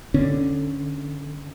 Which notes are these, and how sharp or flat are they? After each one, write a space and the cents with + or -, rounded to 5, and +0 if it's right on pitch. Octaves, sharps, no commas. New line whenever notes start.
D3 +0 C#4 +0